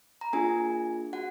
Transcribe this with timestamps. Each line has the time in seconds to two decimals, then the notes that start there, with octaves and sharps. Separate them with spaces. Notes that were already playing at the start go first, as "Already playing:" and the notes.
0.21 A#5
0.33 A#3 D4 F4 G#4 G#5
1.13 F#4 F#5